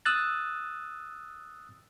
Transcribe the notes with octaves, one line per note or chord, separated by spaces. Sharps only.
D#6 E6 F#6 A6